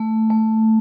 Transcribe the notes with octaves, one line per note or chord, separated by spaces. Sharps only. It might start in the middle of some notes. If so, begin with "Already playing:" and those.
Already playing: A3
A3